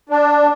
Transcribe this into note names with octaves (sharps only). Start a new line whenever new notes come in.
D4